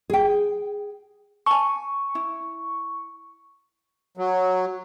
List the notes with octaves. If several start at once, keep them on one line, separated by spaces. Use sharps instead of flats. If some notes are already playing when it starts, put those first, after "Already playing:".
G#4 G5
G#5 A5 C#6
E4
F#3